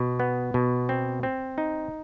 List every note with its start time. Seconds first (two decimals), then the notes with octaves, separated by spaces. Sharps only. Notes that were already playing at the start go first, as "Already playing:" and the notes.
Already playing: B2
0.20 B3
0.54 B2
0.89 C4
1.23 C4
1.58 D#4